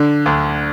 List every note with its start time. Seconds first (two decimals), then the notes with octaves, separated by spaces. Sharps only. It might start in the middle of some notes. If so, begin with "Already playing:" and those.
Already playing: D3
0.26 D2